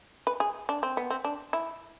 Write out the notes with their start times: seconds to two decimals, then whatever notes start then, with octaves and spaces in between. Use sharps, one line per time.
0.27 B4
0.40 G#4
0.69 D4
0.83 C4
0.97 B3
1.10 C4
1.24 D4
1.53 E4